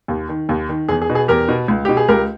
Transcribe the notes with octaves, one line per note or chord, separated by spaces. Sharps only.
D#2
D#3
D#2
D#3
E2 G#4
G#4
B2
G#4
E2 G4 A#4
B2
C#2
B2 G4
G#4
C#2 G4 A#4